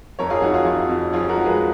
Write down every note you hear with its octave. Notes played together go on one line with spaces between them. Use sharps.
F2 A#4 C#5
F4 G#4
F2 D#4 F#4
F4 G#4
F2 F4
F2
F3 F4 G#4
F#4 A#4
G#3
G#4 B4